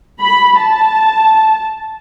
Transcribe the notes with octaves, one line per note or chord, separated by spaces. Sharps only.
B5
A5